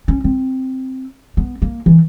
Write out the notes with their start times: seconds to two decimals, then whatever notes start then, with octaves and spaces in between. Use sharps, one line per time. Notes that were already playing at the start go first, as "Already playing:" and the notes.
0.08 C#4
0.24 C4
1.37 B3
1.62 A#3
1.86 E3